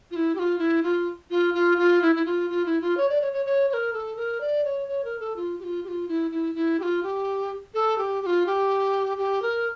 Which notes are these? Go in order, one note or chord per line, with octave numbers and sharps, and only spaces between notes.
F4
E4
G4
F4
E4
F4
F4
F4
F4
E4
E4
F4
F4
E4
F4
C#5
D5
C#5
C#5
C#5
C#5
A#4
A4
A#4
D5
C#5
C#5
A#4
A4
F4
G4
F4
G4
F4
E4
E4
E4
G4
F4
G4
A4
G4
G4
F4
G4
G4
A#4